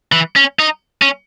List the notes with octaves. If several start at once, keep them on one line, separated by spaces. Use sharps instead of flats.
E3
C#4
D#4
C#4